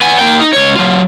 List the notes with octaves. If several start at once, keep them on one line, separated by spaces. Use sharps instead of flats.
B3 G#5
A#3 G5
D#4
C#2 C#5
F#3 F4